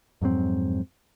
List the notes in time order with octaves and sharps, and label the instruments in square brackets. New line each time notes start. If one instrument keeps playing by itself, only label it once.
[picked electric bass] F2 G#2 F#3 C4